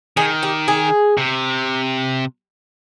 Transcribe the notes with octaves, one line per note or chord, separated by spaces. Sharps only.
D#3 G#4
G4
G#4
C3